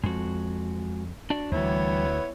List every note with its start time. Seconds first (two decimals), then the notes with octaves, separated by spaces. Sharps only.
0.04 F2 G#3 F#4
1.30 D4 F#4 D5
1.52 D2 E3 G3 B3 E4 C#5